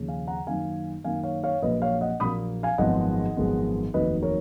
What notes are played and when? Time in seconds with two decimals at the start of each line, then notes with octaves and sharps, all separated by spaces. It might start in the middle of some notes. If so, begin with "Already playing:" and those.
Already playing: D#2 C#3 F3
0.08 F5 G#5
0.27 F#5 A#5
0.46 F#2 D#3 A#3 F5 G#5
1.04 F#2 D#3 A#3 F5 G#5
1.23 C#5 F5
1.44 C#5 F5
1.62 A#1 A#2 F#3 A#3 B4 D#5
1.82 C#5 F5
2.01 D#5 F#5
2.20 A#1 A#2 F#3 A#3 B5 D#6
2.63 F5 G#5
2.78 G#1 F#2 F3 G#3 B3 D#5 F#5
3.37 G#1 F#2 F3 G#3 B3
3.94 F1 D#2 D#3 F#3 B4 D#5
4.22 A#4 C#5